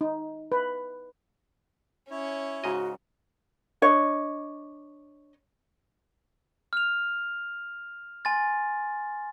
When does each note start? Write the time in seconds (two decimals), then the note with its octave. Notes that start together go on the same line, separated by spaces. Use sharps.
0.01 D#4
0.52 B4
2.11 C#4 E4 C#5
2.64 G#2 C#3 F#4 D#5
3.82 D4 C#5 D#5
6.73 F6 F7
8.25 G#5 C6 A6